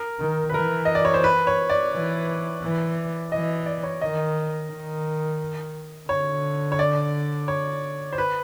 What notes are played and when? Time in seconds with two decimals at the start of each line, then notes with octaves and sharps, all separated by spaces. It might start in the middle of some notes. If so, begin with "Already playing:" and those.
Already playing: A#4
0.19 D#3
0.49 B4
0.54 E3 A#4
0.85 D#5
0.95 D5
1.05 C#5
1.14 C5
1.24 B4
1.47 C#5
1.70 D5
1.93 E3
2.62 E3
3.32 E3 D#5
3.66 D5
3.83 C#5
4.01 D#3 D#5
4.71 D#3
6.09 D3 C#5
6.72 C#5
6.79 D5
7.48 C#5
8.13 C5
8.18 B4